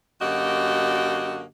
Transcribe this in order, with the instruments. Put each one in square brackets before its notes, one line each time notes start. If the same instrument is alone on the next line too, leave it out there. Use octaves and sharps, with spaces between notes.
[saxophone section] F#2 D3 A#3 F#4 G4 D#5